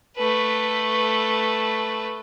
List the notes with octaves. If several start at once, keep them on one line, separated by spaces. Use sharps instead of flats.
A3 B4